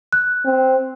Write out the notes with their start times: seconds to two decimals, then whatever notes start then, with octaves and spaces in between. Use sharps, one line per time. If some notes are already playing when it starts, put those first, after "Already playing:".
0.13 F#6
0.45 C4